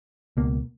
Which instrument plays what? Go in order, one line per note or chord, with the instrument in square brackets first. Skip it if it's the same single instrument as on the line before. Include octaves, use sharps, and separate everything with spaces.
[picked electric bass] C#2 B2 A#3